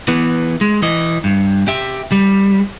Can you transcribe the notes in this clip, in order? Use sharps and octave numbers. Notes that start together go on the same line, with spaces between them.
E3 B3
G#3
E3 D#5
G2
G4 E5
G3